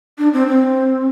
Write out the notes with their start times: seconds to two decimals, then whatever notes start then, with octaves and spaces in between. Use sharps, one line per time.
0.18 D4
0.33 C4
0.48 C4